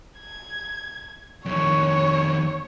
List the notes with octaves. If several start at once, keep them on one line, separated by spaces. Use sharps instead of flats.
G#6
F2 D#3 C#5